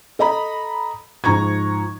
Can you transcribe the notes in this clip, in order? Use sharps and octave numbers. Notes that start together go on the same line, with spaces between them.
A4 D#5 A#5 B5
G#2 F3 A#5 C#6 G#6